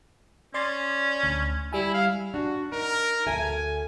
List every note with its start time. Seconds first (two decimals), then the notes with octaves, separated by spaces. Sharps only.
0.54 C#4 D5 C6 A6
1.23 D2
1.73 G3 E4 G#5
1.94 F5
2.34 D4 F#4
2.72 D#4 A#4
3.27 D2 A4 E5 G#5